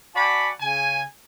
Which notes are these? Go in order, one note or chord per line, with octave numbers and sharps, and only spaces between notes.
F#4 D5 F#5 G#5 A5 B5
C#3 G#5